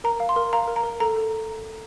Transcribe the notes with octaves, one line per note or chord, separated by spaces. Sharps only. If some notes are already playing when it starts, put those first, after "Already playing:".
A#4 A#5
F5
C6
A#4
F5 A#5
A#4
A#5
A#4
A4 A#5
A4